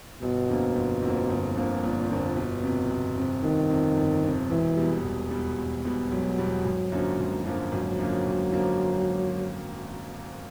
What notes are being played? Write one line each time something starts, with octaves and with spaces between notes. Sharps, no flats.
G1 B2
F2 D3 F3 A#3
G1
F2 D3 F3 A#3
G1
F2 D3 F3 A#3
G1 A#2
F2 D3 F3 A#3
G1 B2
F2 C3
G1
F2 C3
G1 D#3
F2 C3
G1
F2 C3
E1 E3
E2 B2 G3
E1
E2 B2 G3
E1
E2 B2 G3
E1 F#3
E2 B2 G3
G#1
F#2 D3 F3 A#3
G#1
F#2 D3 F3 A#3
G#1 F#3
F#2 D3 F3 A#3
G#1
F#2 D3 F3 A#3